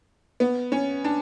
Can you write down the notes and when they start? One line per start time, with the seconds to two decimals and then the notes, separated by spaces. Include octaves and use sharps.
0.40 B3
0.72 C#4
1.04 D4